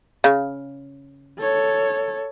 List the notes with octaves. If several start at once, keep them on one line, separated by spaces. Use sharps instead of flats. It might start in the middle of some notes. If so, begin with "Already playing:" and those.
C#3
A4 C#5